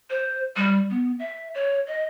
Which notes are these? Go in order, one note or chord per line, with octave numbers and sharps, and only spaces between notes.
C5
G3
B3
E5
C#5
D#5